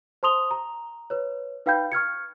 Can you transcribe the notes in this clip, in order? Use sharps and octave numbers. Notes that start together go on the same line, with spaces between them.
C5 A5 C6 D#6 F7 G7
A#5
B4 C#5
D#4 B4 F5 G5 B5 G6
C#6 F6 G#6 C#7